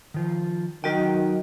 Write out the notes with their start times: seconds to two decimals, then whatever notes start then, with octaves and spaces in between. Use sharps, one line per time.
0.14 D#3 F3
0.84 D#3 F#3 D#4 F#4 A#4 D#5 G5